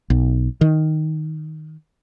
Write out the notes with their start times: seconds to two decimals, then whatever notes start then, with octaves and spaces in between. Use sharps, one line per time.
0.10 B1
0.61 D#3